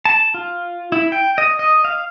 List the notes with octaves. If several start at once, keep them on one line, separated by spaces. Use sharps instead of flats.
A5
F4
E4
G5
D#5
D#5
F5